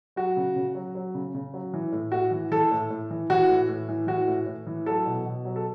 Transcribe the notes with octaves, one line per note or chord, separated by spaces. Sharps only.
F#3 F#4
C#3
C#3
F#3
F#3
C#3
C#3
F#3
E3
A2
A2 F#4
E3
E3 A4
A2
A2
E3
E3 F#4
A2
A2
E3
E3 F#4
A2
A2
E3
F#3 A4
B2
B2
F#3
A4